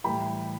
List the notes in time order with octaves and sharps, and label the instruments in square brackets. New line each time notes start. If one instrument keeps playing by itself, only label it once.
[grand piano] A2 E3 G3 G5 B5